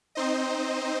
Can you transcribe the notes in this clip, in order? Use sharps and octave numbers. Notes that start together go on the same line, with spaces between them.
C4 D#4 C5 D#5